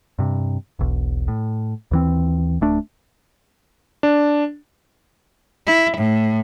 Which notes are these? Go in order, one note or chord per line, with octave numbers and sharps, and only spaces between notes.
G2 C3
E1 B1
A2
D#2 E3 C4
D1 A3 D4
D4
E4
A2